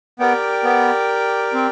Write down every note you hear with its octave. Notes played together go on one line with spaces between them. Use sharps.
B3 G4 A#4 D5 G5
B3
C4